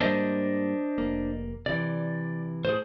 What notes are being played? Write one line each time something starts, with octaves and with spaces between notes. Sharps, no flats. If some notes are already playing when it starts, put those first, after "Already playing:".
G#2 G3 A#3 D4 C5 D#5
F1 A#3
C3 E3 D5
A2 G#4 C5